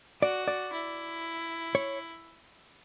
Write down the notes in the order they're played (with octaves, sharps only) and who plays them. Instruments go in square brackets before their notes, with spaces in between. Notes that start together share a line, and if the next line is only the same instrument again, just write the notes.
[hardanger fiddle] F#4 [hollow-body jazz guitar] D5
[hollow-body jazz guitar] D5
[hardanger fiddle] E4
[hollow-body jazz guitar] C#5